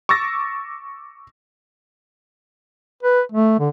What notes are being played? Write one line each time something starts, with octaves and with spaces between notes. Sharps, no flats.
C#6 D6 E6 A6 A#6
B4
A3
D3